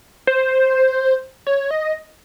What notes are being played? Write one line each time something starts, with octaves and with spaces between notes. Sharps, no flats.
C5
C#5
D#5